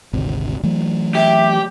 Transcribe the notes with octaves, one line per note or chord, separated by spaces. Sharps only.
G#1 D2 C3
E3 F#3 A3
G4 E5